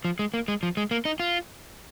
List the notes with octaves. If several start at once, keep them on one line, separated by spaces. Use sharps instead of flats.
F3
G#3
A#3
G#3
F3
G#3
A#3
D#4
F4